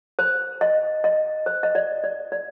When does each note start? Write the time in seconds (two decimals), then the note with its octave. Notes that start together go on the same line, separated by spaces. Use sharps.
0.19 C5
0.61 D#5
1.04 D#5
1.46 C5
1.63 D#5
1.75 D5
2.04 D5
2.32 D5